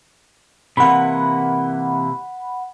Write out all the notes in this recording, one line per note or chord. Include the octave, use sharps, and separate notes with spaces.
C3 E3 A#3 F#5 B5